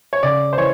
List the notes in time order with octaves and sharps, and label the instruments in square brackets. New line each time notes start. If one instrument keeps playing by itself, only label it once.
[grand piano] C#5
C#3 D5
C5
E3 C#5